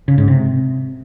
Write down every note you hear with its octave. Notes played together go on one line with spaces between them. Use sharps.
C#3
G#2
C3